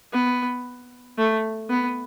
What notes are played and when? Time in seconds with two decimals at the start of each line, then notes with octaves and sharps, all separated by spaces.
0.13 B3
1.18 A3
1.69 B3